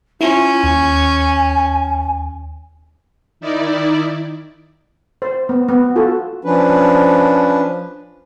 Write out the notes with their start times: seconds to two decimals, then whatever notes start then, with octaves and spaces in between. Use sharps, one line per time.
0.21 C#4 E4 F4
0.64 D#2 G#5
3.40 D#3 D#4 E4 D5
5.22 C5
5.49 B3
5.69 B3
5.96 F4 F#4 A4
6.45 F3 C#4 D4 B4